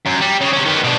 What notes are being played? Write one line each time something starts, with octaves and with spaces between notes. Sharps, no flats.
F#2
G3
C#3
C3 C#4
D#3 B3
B2 D4